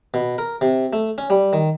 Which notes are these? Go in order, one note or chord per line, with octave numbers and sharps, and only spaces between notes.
B2
A#4
C3
A3
C#4
G3
D#3